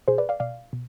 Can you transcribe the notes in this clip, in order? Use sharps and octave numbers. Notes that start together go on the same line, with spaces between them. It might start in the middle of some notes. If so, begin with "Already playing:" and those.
B2 G#4 C5
B4 D5
D5 F5
B2 D5 F5
B2